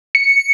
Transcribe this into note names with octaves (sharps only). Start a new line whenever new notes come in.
C#7